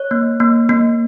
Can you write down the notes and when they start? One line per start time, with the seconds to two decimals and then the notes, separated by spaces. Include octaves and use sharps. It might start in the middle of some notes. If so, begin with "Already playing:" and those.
Already playing: C#5
0.11 A#3
0.40 A#3
0.69 A#3